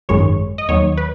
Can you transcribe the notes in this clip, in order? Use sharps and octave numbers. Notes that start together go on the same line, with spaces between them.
G#1 F#2 D#3 G#3 C#5
D#5
D#2 D#3 F#3 C#5
B4